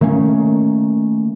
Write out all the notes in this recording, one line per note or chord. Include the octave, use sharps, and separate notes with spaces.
D#3 A3 A#3 C#4